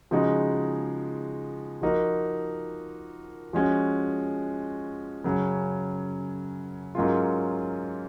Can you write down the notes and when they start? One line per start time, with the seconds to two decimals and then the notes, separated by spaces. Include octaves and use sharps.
0.11 C#3 F3 G#3 D#4 F#4
1.82 F3 A#3 D#4 F#4
3.53 F3 G#3 C#4 F#4
5.24 F#2 C#3 F#3 C#4
6.95 G#2 F#3 A#3 C#4 F4